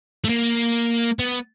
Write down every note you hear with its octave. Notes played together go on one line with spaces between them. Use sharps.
A3
A#3
B3